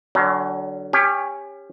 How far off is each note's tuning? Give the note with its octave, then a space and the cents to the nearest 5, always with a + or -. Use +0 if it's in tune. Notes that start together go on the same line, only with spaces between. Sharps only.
D3 +0 F#3 +30 C#4 +0
C#4 +0 G4 +25